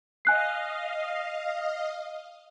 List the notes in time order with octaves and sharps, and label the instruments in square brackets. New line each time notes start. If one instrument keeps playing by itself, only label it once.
[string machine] D#5 F5 [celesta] G#5 F#6 C7